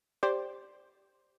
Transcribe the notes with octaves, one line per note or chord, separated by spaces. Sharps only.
G4 C5 D5